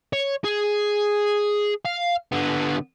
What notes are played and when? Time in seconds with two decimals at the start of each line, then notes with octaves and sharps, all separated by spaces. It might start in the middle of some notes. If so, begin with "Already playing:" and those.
0.13 C#5
0.44 G#4
1.85 F5
2.32 D3 B3